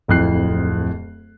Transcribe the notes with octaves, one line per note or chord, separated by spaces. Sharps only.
D1 F2 E4 F#6 C7